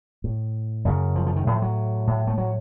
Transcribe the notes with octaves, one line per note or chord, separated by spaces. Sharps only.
A2
F#2 C#3
F3
F3
D#3
A2 F3
F#3
A2
A3
F#3